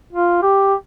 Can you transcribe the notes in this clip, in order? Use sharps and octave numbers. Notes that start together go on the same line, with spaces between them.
F4
G4